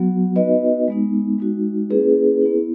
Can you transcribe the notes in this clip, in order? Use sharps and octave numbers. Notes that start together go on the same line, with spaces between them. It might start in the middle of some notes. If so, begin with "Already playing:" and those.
Already playing: F#3 B3 F#4
B3 D#4 F#4 B4 D#5
G#3 B3 D#4
G#3 D#4 F#4
A#3 C#4 E4 G#4 B4
B3 E4